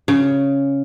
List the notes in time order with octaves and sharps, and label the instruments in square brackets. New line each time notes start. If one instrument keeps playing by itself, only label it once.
[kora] C#3